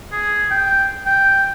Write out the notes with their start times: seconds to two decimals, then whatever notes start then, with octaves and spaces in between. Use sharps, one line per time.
0.12 G#4
0.51 G5
1.06 G5